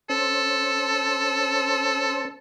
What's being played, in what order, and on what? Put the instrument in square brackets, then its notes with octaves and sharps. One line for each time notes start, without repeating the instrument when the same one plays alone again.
[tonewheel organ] C#4 C5 [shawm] A4